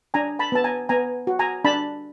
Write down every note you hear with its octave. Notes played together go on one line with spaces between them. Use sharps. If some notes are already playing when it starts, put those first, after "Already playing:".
D4 G#5 A#5
A5 B5
B3 A5
G#5 A#5
B3 G#5 A#5
F#4
G#5 A#5
D4 A5 B5